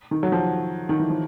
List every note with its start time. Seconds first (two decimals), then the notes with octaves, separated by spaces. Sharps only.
0.11 D#3
0.23 F#3
0.32 F3
0.89 D#3
0.99 E3
1.10 F3